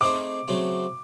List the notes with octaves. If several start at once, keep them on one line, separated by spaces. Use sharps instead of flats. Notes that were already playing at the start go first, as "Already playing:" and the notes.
A3 C4 D#4 G#4 C5 D6
C#3 F#3 A3 C4